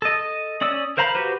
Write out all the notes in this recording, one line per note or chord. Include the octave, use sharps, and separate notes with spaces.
A4 D#5
C#4 D5 D#6 E6
A#4 C5 F5 A#5 B5
F#4 G4 B4 C5